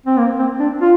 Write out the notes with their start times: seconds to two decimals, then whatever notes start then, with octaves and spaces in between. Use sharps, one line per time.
0.06 C4
0.18 A#3
0.39 C4
0.60 D4
0.82 F4